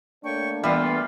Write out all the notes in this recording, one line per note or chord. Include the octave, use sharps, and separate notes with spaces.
A3 A#3 D4 C#5 G5 C#6
E3 G3 B3 F4 E5